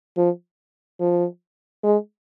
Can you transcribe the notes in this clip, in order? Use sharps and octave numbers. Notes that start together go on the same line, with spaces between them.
F3
F3
G#3